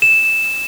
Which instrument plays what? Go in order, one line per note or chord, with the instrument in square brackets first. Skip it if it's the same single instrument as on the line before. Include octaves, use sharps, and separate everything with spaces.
[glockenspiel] E7